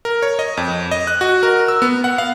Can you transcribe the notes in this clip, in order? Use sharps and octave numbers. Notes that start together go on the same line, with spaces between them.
A#4
C#5
D#5
F2
D#5
F#6
F#4
A#4
E6
B3
F#5
F5